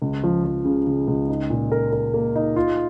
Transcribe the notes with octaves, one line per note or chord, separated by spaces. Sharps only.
C#2
F3
F3
C#3
C#3
C#2
D#4
A#2
A#4
A#4
A#3
D#4
F4